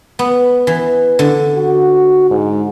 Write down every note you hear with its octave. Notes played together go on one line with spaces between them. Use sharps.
B3
E3
D3
F#4
G#2